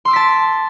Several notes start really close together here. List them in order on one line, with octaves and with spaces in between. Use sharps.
C6 E6 D6 B6 A5